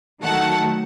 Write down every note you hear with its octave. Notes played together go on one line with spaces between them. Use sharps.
D#3 F#3 A3 F#5 A5